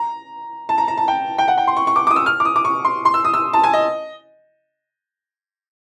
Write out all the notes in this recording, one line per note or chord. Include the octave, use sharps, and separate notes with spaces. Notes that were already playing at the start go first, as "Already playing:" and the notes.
Already playing: A#5
A5
A#5
A#5
A5
G5
G5
F#5
G5
C6
C#6
C#6
D6
D6 D#6
E6
F6
D6
D#6
D6
C#6
C6
C6
E6
D#6
E6
A5
G#5
D#5